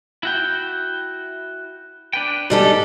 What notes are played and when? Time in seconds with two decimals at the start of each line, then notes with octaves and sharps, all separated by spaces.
0.23 E4 F#4 G5
2.13 D4 B4 G5
2.50 G#2 G3 D4 A4